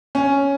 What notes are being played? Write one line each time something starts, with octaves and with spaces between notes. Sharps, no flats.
C#4